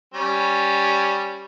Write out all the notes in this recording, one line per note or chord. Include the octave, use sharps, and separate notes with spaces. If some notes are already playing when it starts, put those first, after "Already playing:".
G3 C#4